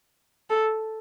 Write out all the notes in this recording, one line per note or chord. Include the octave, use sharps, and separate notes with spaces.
A4